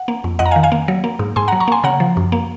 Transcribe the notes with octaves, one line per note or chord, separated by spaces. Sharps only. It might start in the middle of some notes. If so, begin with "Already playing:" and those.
Already playing: F#5
A#3
F2
F2 D#5 F#5
A#5
F5 G#5
D#3
F5 G#5
A#3
F#3
A#3
G#2
G#2 G#5 C6
F#5 A#5
F#3
A#5 C#6
A#3 G#5 C6
C#3 F#5 A#5
F3
F#2
A#3